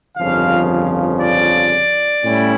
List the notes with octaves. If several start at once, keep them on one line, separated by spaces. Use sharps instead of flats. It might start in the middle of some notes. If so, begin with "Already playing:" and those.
G1 F2 C#3 F3 F5
D5
A2 G3 C#4 E4